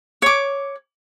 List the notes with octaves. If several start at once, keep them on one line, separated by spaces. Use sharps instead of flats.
C#5 D6